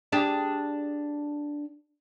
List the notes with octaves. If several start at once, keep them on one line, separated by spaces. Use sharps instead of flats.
D4 G4 G#4